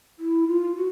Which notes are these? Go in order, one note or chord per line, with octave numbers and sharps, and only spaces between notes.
E4
F4
F#4